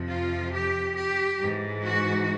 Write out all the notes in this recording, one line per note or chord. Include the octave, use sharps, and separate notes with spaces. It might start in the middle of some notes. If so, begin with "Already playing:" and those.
Already playing: F2 C3 F3
F4
G4
G4
G#2 E3
F#4